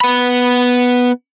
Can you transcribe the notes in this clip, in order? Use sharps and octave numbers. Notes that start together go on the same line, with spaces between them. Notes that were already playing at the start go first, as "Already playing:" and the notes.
B3 B5